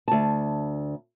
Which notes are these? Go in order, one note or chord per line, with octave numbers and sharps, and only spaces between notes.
D2 A5